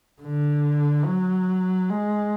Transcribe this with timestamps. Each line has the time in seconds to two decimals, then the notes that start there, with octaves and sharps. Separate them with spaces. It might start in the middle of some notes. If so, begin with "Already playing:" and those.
0.22 D3
1.05 F#3
1.89 G#3